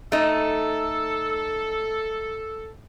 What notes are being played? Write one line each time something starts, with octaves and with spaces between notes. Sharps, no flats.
A3 D#4 A4